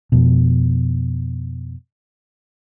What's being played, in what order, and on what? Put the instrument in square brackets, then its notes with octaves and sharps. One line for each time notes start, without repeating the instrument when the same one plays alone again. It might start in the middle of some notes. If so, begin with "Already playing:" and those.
[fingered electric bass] F2 B2